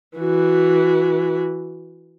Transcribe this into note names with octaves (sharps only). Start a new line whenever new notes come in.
E3 F#4